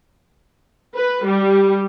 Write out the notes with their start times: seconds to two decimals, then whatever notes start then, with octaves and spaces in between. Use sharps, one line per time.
0.95 B4
1.25 G3